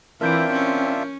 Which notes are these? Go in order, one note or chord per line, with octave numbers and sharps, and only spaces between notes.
E3 C4 D4 F4 A#4 E5 G6 D7
C#4